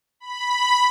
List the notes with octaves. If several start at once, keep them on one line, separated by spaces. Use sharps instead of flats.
B5